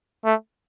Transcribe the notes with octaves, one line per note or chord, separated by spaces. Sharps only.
A3